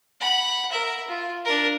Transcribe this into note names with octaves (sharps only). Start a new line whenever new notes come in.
F#5 B5
A#4 E5
F4
D4 A#4